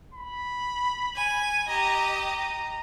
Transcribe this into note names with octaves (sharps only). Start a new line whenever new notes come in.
B5
G#5
G4 D#5 A#5
A#5